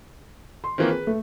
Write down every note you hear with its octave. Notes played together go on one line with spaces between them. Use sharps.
C6
D#3 E3 A#3 C4 F4 A#4
G#4 B4
A3